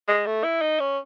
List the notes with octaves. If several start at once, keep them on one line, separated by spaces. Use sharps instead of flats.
G#3
A3
E4
D#4
C#4